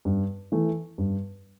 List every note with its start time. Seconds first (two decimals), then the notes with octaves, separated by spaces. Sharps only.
0.05 G2
0.52 E3 A3
0.98 G2